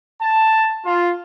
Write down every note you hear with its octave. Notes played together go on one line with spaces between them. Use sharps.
A5
F4